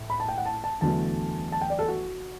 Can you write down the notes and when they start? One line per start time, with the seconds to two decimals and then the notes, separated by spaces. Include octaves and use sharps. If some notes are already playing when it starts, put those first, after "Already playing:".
Already playing: A2 A3
0.10 B5
0.20 A5
0.28 G5
0.38 F#5
0.45 A5
0.64 A5
0.81 E2 D3 F#3 A3 A5
1.52 A5
1.61 G5
1.70 D5
1.79 A4
1.88 F#4